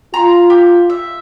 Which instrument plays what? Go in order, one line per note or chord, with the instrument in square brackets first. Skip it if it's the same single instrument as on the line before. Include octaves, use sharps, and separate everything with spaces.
[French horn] F4 [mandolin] A#5 C6
[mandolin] G4
E5